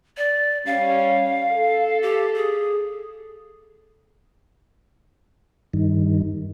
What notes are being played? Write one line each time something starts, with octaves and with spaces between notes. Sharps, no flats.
D5
G3 C#4 F5
A4
G4
G#4
G2 D#3